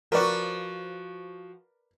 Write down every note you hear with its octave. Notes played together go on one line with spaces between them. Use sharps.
F3 F#4 A#4 B4 D5